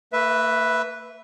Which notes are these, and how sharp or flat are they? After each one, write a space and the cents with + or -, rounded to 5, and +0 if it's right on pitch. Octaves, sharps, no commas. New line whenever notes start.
A#3 -45 B4 +0 E5 +0